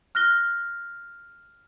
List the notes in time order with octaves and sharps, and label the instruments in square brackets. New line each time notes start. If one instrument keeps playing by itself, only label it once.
[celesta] F6 F#6 A#6 G7